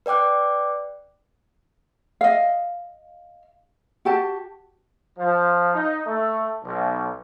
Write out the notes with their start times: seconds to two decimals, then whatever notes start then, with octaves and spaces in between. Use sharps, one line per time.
0.06 B4 D5 G5 D6 F#6
2.21 D#5 F5
4.05 F#4 G4 A5
5.19 F3
5.74 D#4
6.06 A3
6.64 B1